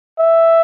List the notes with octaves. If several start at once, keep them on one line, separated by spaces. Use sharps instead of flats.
E5